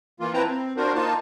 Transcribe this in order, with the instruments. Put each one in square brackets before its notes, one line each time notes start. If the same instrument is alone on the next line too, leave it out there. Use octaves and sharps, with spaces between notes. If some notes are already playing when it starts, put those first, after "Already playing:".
[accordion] E3 A#3 F4
C4 E4 B4 G5 A5 A#5
C4
D4 F4 F#4 A#4 C5
A#3 D#4 F4 A5